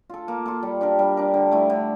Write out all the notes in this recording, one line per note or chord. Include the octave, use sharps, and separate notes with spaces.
F4 A4
A#3
F4 A4
G3
D4 G4 A#4
G3
D4 G4 A#4
D3
A3 E4
D3